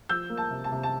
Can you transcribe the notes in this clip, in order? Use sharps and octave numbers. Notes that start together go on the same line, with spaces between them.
F3 E6 G6
A#3
A5
C3
A5
C3
A5